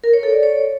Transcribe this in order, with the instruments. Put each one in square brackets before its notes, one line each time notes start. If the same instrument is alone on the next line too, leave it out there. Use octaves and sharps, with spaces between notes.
[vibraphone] A#4
C#5
A4
D5
C#5